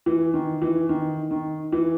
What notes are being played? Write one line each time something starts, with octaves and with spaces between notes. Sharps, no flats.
E3
D#3
E3
D#3
D#3
E3